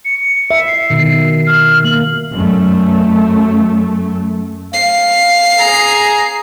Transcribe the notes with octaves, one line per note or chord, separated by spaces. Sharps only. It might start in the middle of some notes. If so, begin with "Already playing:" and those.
C#7
E5
C7
B2 D#3
F6
A#3 F#7
F#2 A3
F5 C7
G#4 A#5